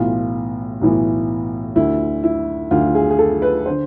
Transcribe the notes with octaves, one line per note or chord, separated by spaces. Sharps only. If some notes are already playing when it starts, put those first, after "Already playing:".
Already playing: B1 A2 E3 F4
B1 A2 E3
D2 D3 E4
E4
D2 D3 F4
G#4
G#4
A4
B4
D3 C5